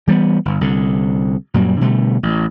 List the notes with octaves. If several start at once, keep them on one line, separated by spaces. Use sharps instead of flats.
E3 G3 A#3 B3
G1
C2 D3
F#2 A#2 F#3 G3
B2 D3 G3 A3
A1